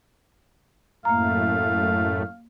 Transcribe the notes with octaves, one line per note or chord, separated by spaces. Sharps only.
F#2 A2 A3 A#3 F5 A#5